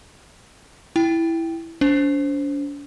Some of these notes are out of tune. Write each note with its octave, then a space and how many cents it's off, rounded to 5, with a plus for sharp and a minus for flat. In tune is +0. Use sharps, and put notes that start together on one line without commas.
E4 +0 G5 +0
D4 -45 C5 +0